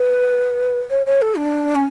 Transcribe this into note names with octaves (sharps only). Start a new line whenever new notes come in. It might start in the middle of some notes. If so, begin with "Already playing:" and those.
Already playing: B4
C#5
C#5
A4
D4
C#4